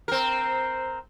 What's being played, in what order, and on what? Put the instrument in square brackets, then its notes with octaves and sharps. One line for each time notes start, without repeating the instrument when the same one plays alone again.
[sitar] C4 A#4